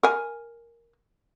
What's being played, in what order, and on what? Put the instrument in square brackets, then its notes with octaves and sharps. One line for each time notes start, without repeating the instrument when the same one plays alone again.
[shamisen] A#4 G#5